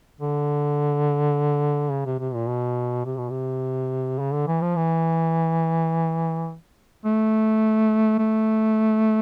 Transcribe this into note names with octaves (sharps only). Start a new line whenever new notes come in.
D3
C#3
C3
C3
A#2
B2
C3
B2
C3
C#3
D3
E3
F3
E3
A3
A3